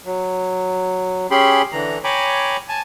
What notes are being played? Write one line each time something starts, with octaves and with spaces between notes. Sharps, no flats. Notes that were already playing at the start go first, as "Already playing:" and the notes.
F#3
C#4 G4 G#4 G5 B5 C6
D3 E3 A#5
C#5 G5 G#5 A#5 B5 D6
G#5 A5